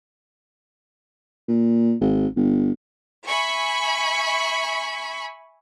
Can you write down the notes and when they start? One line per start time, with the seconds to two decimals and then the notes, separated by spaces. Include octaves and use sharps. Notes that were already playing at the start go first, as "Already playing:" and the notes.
1.48 A#2
2.01 G#1
2.37 G1
3.26 E5 G#5 B5 C#6